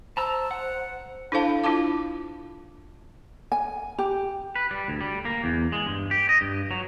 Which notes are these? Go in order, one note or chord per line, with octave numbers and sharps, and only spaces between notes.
C5 A5 A#5 E6
F#5
D4 E4 A4 C5 F5 A5
D4 E4 F4 A5 D6
G#5
G4
B4
G3
D2
G3
A#3
E2
G#3
G2
G4
D#5
G2
F#3